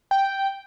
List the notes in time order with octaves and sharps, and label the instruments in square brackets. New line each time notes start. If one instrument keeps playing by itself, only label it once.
[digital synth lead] G5